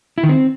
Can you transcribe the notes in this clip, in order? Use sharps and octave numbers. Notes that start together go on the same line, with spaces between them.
E4
D#3
C4